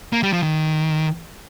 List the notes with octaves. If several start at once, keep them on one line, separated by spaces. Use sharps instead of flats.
A#3
G3
F3
D#3